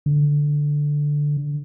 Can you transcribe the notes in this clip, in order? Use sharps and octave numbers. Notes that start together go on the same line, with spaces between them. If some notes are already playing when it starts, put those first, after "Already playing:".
D3